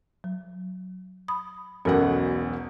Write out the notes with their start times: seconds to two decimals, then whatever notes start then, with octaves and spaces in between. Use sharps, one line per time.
0.24 F#3
1.28 B5 D#6
1.85 E1 B1 C#4 A4 A#4 F#5